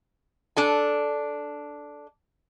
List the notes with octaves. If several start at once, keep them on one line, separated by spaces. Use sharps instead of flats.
D4 A4 G#5